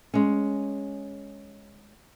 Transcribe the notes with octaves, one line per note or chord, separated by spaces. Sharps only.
G#3 C#4